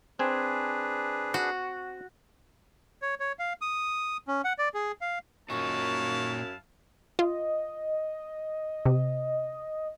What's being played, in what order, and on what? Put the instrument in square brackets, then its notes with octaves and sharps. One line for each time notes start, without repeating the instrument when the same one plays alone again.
[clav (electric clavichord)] C4 G#5 [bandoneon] D4 G#4 B4
[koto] F#4
[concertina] C#5
C#5
F5
D#6
C#4
F#5
D5
G#4
F5
[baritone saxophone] F#2 [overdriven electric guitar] A#2 D#4 [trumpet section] E4 F5 A5 [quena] C#6
[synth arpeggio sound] F4 [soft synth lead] D#5
[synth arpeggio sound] C3